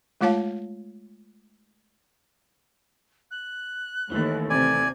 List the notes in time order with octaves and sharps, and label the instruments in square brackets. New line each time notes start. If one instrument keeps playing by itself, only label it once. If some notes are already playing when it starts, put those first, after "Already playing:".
[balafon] G#3 A3 F4 C#5 F5 A5
[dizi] F#6
[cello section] D#2 [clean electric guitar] E3 A3
[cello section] C3 [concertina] D5 G#5 [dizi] G#6